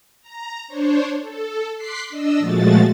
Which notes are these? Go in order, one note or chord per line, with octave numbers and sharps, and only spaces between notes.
A#5
D4 C5 C#5
A4
C6 D6 F#6 B6 C7
D4 D#5 E6
A#2 F3 G#3 A3 F#4 A6